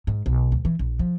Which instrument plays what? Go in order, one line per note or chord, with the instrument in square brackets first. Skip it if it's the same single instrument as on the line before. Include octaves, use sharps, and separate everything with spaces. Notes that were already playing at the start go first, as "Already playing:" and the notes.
[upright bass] G#2
B1
D2
E3
A#1
F3